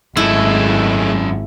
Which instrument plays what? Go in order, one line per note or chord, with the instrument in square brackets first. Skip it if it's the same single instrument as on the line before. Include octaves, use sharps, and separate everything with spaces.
[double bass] G#1 [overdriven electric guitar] F#2 A4 [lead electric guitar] G#3 A3 [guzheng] E4